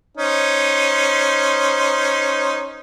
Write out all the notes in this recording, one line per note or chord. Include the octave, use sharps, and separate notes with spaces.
C#4 D#4 C5